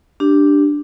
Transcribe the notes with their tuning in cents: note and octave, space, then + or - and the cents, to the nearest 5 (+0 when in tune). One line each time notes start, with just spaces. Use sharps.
D4 +0 G4 +0